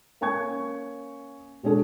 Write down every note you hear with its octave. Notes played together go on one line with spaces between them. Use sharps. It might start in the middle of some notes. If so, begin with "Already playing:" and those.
A#3 C#4 G#5 C#6 G#6
B2 G#3 C#4 D4 G#4 A4